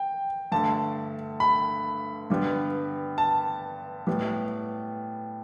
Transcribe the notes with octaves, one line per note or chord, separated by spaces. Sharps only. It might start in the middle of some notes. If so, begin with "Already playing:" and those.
Already playing: G5
G2 D3 A3 A5
B5
G2 D3 G3 B3
A5
A2 G3 B3